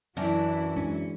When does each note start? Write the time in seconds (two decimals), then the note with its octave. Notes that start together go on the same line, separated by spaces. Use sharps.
0.17 F#2 E3 F#3 D4 E4
0.76 G#3 C#4 D4